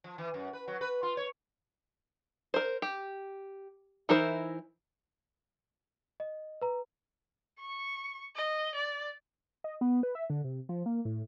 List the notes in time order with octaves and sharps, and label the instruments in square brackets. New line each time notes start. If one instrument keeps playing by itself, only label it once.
[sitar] F3
E3
F#2
B4
F#3
B4
F4
C#5
[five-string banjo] A#4 C5
G4
E3 D#4 E4 A#4 C5
[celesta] D#5
B4 A#5
[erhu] C#6
D#5
D5
[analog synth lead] D#5
B3
B4
E5
D3
C3
F3
A#3
A2